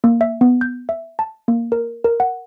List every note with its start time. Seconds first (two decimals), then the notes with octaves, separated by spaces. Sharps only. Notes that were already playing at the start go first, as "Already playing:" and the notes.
0.04 A#3
0.21 E5
0.41 B3
0.61 G6
0.89 E5
1.19 A5
1.48 A#3
1.72 A#4
2.04 A#4
2.20 F#5